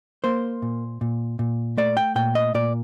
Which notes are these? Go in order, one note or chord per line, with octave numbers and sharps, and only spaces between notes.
A#3 C5
A#2
A#2
A#2
A3 D5
G5
A#2 G5
D#5
A#2 D5